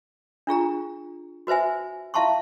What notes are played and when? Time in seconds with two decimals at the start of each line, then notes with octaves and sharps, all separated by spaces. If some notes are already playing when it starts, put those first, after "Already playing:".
0.47 D4 F4 G#4 A#5
1.47 F#4 B4 C5 E5 G#5
2.14 E4 E5 F5 A5 C6 C#6